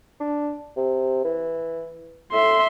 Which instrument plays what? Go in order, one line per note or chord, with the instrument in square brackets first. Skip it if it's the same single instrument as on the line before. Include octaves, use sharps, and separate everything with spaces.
[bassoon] D4
C3
E3
[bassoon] A2 [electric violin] E5 C6